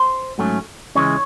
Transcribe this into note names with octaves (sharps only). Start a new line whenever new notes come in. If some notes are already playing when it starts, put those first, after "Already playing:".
Already playing: C5
G#2 F#3 A3 C#4
C#2 C3 E3 G#3 C#4 C#5